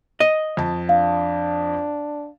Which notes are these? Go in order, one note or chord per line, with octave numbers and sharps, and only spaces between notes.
D#5
F2 A5
D4 F5